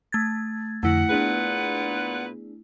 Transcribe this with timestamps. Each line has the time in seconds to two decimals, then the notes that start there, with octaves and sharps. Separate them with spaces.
0.12 A3 G#6 A6
0.83 F2 D3 A3 E4 F#5
1.10 A#2 B3 D4 G#4 B4